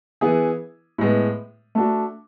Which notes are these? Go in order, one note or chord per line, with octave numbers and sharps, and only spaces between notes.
E3 B3 E4 G#4
A2 G#3 B3
A3 D4 F#4